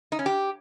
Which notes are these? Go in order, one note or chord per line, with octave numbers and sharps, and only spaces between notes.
D#4
C#4
G4